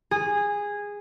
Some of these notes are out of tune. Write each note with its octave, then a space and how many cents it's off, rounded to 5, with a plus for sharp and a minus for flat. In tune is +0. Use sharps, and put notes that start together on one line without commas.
G#4 -15